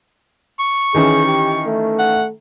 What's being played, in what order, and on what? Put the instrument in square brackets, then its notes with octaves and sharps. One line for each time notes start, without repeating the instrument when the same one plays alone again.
[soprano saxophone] C#6
[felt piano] D#3 E3 C#4 [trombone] G#4
[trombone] G4
A3
[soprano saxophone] F#5